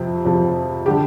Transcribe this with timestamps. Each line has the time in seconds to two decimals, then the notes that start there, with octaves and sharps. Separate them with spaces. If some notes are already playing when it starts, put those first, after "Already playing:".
Already playing: F2 C3 F3 C4
0.25 F2 C3 F3
0.86 D3 G3 G4